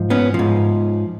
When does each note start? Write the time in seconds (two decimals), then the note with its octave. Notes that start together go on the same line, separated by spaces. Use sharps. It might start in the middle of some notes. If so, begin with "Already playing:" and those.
Already playing: G#2 F3
0.10 B3 C#4
0.34 G#2 F3